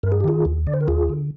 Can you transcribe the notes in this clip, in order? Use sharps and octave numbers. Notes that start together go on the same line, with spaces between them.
G2 A#4
G#4
G4
D#3 F4 G#4
D#2
D3 D5
C5
A#4
D#2 F4 G#4
D3